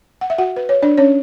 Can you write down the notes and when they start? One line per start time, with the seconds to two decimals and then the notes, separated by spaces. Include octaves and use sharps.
0.21 F#5
0.30 E5
0.38 F#4 F#5
0.56 B4
0.69 C#5
0.82 D4 D5
0.98 C#4 C#5